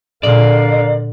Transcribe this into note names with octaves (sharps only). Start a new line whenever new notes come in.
A#2 D3 A#4 D5 F5